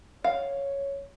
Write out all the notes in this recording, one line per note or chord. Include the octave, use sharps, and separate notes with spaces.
C#5 F5